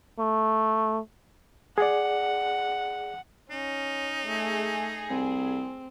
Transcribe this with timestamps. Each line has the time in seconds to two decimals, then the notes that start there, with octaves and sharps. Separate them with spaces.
0.19 A3
1.78 G#4 D5 F#5
3.50 C#4 D#4
4.27 A3 G#4
5.10 C2 C4